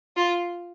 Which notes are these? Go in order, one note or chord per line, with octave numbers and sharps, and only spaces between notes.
F4